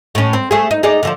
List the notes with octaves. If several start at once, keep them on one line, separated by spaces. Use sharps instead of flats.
A2 C#4
C4
A3 G#4
D#4
D#4 G#4 D5
D3 E3 F3